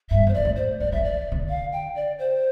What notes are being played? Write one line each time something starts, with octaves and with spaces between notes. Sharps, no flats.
G2 E5
F2
E2 C5
F2 D5
A2
C5
F3 D5
E3 F3 E5
D5
D3
F5
G5
D5
C5